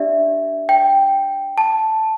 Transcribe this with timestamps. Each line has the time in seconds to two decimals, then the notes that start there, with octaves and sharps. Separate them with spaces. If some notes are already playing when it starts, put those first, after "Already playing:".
Already playing: D4 G4 D5 E5
0.69 G5
1.58 A5